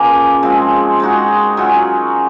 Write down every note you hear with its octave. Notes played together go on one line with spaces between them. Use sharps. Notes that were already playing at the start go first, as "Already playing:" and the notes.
Already playing: C#3 F3 A#3
F3 G#3 C4
G#3 D#4 F#4
F#3 C#4 F4 G#4